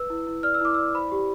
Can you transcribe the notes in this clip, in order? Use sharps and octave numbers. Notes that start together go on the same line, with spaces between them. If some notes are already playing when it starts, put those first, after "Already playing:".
Already playing: B4 E6
E4
E4
D5 F6
E6
E4 D6
E6
D5
C5 B5
G4